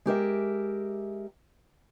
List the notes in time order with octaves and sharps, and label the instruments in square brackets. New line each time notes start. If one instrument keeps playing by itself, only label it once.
[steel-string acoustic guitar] G#3 G4 A#4 E5